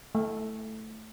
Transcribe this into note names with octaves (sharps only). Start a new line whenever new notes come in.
A3